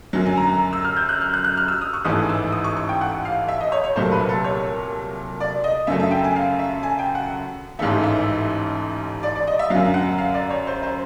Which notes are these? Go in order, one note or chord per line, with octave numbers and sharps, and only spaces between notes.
F#2 D3 F#3
G#5
A#5
A#5
E6
F6
G6
F#6
F6
F#6
F#6
F6
E6
D#6
C#6
A1 G#2 E3 A3 D#6
E6
D#6
C#6
C#6
G5
F#5
F5
E5
D#5
C#5
C#5
C2 A#2 F#3 A3 C5
B4
A4
C#5
D5
D#5
F#2 C#3 F#3 A3 E5
E5
G5
G#5
F5
E5
G#5
G5
F#5
A1 G#2 E3 A3 E5
E5
D5
D5
D#5
E5
F#2 D3 F#3 F5
F#5
F5
D5
C#5
C5
C5